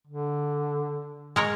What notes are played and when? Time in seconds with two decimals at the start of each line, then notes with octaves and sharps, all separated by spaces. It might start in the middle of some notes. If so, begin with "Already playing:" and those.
0.07 D3
1.36 G#3 A#4 C#5